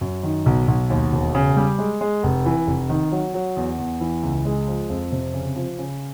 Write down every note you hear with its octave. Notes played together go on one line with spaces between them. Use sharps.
F#2
D#3
B1
B1
D#2
E1
C#3
G3
G#3
G#3
F1
E3
F1
D#3
F#3
F#3
E2
E2
E3
C#2
G#3
F3
F2
C3
C#3
F3
C#3